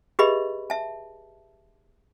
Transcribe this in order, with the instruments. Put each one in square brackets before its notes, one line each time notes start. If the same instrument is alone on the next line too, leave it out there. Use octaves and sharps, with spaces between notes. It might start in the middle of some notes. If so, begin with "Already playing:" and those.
[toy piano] G4 G#4 B4 D#5 E5 B5
E5 A5